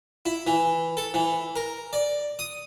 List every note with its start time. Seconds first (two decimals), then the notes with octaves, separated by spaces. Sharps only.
0.26 E4
0.47 E3
0.97 A4
1.14 E3
1.56 A#4
1.93 D5
2.39 D#6